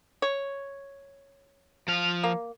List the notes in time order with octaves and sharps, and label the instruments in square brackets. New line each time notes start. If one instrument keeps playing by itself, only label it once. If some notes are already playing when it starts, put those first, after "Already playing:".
[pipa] C#5
[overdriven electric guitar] F3 F5
[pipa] A#3